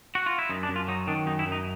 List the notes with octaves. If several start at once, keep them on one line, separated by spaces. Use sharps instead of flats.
F#4
F4
E4
F#2 D#4
D4
F#2
F4
F#3 D#4
D#3 D4
F#2 D#4
E4
F#2
D#4